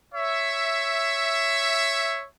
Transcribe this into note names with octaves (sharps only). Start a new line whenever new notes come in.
C#5 E5